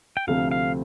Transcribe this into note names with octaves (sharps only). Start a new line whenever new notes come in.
G5
D2 C3 F3 A3 C4 F5
F5